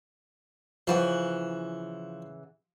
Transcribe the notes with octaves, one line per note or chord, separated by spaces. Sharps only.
C#3 E3 F3 F#5